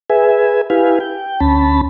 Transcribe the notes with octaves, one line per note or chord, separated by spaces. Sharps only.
G#4 B4 E5 G#5
E4 G4 B4 F5 G#5
G5
D2 C#4 A5 B5